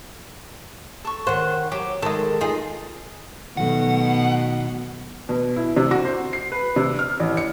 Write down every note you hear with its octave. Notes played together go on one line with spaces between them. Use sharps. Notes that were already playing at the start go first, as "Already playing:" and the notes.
A4 C#6
D#3 C5 F#5
F#3 G4
D#3 G#3 A4 D#5
D#4 F4 G#4
B2 D#3 F#3 A3 F#5
B2
E4
C3
F#4
C5
C7
B4
C3
F6
A1
C#7